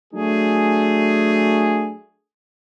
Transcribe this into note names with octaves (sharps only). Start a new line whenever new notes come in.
F#3 A3 D4 G#4